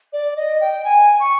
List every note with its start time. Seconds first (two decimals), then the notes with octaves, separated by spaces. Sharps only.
0.13 D5
0.36 D#5
0.61 G5
0.85 G#5
1.20 C#6